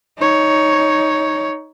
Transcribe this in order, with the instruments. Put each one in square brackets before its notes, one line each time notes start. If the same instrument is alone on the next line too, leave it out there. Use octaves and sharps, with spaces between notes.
[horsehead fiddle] D#4 C#5